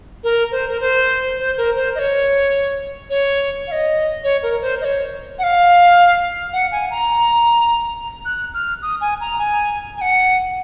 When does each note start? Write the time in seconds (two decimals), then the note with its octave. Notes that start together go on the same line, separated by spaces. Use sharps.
0.24 A#4
0.51 C5
0.68 A#4
0.80 C5
1.38 C5
1.57 A#4
1.76 C5
1.95 D#5
1.99 C#5
3.10 C#5
3.67 F5
3.72 D#5
4.24 C#5
4.43 A#4
4.61 C5
4.81 D#5
4.84 C#5
5.39 F#5
5.43 F5
6.53 F#5
6.72 G#5
6.91 A#5
8.25 F#6
8.54 F6
8.82 D#6
9.01 G#5
9.21 A#5
9.39 G#5
9.97 G#5
10.01 F#5